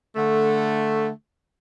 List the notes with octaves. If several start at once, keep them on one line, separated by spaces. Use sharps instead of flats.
D3 A3